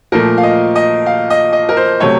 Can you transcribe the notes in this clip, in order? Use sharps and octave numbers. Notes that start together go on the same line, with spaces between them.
A#2 F3 A3 A#4
F5
D#5
D#5
F5
D#5
D#5
A#4
C5
C3 F#3 A3 C#5